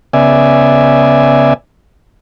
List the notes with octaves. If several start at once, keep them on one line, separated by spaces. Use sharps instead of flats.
C#3 B3 D5 E5 G#5